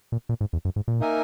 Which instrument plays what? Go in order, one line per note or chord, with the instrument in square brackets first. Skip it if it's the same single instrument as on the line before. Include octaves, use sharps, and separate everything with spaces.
[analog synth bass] A#2
A#2
G#2
E2
F#2
G#2
A#2
[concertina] A#3 D#4 A#4 E5 G#5